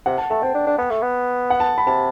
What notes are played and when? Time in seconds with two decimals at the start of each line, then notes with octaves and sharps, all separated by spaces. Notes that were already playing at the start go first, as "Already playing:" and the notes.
0.06 C3 F#5
0.18 A5
0.30 A3 A5
0.42 C4 G5
0.54 D4
0.66 D4
0.78 B3
0.90 A3
1.02 B3
1.50 F#5
1.60 A5
1.78 B5
1.86 C3 A5